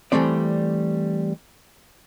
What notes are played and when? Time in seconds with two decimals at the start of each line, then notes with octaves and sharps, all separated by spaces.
0.12 E3 F3 G3 A3 C4 D5